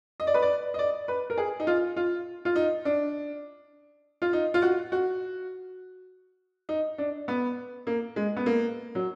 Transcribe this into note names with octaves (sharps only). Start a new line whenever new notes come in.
D#5
D5
B4
D5
D#5
D5
B4
A#4
G#4
D#4
F4
F4
F4
D#4
D4
F4
D#4
F4
F#4
F#4
D#4
D4
B3
A#3
G#3
B3
A#3
F#3